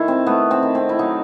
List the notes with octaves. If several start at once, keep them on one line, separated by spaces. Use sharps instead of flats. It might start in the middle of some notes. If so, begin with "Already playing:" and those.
Already playing: D#3 A3 E4
C4
A3 B3
C4
D#3
C4
E4
F#3 D#4